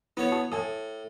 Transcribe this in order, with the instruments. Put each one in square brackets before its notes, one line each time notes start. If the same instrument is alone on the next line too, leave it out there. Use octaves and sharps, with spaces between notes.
[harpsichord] B3 C#5 [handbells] E4
[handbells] F#4 A5 D#6
[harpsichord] A2 [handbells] G#5 A5 D#6